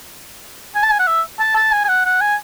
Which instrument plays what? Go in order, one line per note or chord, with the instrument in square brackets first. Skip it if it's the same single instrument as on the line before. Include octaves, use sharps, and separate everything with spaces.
[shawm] G#5
A5
G#5
F#5
E5
A5
A5
G#5
G#5
F#5
F#5
G#5